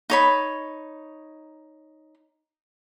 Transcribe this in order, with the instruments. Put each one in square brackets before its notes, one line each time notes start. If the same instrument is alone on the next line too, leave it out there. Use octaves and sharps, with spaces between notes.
[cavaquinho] D#4 C#5 B5